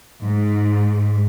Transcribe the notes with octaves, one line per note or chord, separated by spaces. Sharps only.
G#2